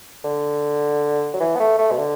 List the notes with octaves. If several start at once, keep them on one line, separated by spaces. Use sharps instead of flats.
D3
F#3
E3
B3
A3
A3
B2
D3